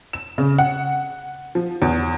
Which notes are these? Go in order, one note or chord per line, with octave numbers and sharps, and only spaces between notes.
E7
C#3
F#5
F3
E2